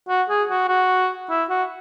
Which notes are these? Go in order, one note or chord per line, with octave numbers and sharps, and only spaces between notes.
F#4
G#4
F#4
F#4
E4
F#4